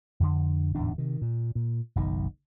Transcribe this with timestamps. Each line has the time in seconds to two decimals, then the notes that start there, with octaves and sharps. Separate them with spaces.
0.20 F2 D3
0.75 D1 E2 G#2 D4
0.98 C3 D#3
1.21 A#2
1.55 A#2
1.96 F#1 B1 C3 D#3